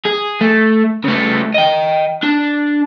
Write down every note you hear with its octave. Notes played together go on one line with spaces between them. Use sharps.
G#4
A3
C#3 A3
D#5 G5
D4